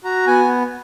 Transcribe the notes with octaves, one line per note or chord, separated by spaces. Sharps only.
F#4 A#5
B3 G#5